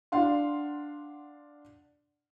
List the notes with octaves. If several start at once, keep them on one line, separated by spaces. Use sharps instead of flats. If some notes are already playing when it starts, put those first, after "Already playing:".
D4 F5 F#5 C6